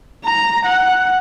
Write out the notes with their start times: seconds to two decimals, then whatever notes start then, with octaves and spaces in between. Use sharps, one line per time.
0.24 A#5
0.65 F#5